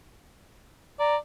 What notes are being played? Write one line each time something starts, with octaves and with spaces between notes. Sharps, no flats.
D5 A#5